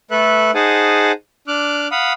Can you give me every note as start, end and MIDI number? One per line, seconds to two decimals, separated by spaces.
0.11 0.51 57
0.11 0.51 69
0.11 0.51 71
0.11 0.51 76
0.11 0.51 90
0.55 1.12 63
0.55 1.12 68
0.55 1.12 72
0.55 1.12 78
0.55 1.12 80
0.55 1.12 81
1.48 1.88 62
1.48 1.88 86
1.48 1.88 89
1.48 1.88 90
1.91 2.13 77
1.91 2.13 78
1.91 2.13 83
1.91 2.13 87